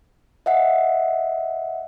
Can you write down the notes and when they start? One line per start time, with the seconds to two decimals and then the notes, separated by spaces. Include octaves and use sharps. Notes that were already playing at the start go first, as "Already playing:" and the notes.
0.46 D#5 E5 F#5